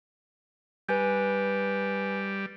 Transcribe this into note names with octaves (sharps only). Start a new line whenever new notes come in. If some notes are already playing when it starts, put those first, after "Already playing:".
G3 B4 G#5 G6